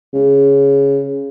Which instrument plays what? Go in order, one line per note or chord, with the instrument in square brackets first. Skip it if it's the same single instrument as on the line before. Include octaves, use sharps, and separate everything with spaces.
[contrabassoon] C#3